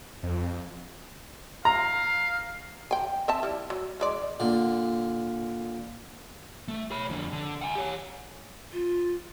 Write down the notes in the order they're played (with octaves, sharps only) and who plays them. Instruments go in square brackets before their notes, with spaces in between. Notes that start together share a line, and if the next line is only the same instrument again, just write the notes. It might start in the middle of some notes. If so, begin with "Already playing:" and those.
[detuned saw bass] F2
[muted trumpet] F5 [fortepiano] A#5
[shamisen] G5 G#5
C4 E5 A5
G3 E4
F#3
E3 G#3 D5
[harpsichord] A#2 D3
[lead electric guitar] A3
C#5 B5
F2 D3
D3
F#5 G#5
G4 C#5
[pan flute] F4